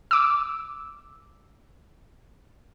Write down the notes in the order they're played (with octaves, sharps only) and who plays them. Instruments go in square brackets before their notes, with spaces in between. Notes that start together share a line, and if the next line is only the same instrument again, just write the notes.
[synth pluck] D6 E6